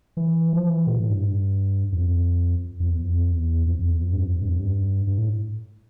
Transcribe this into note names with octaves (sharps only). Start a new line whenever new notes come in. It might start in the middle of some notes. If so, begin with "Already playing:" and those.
E3
F3
E3
A#2
A2
G2
F2
F2
E2
F2
E2
F2
F2
E2
F2
G2
F2
G2
F2
G2
G2
A2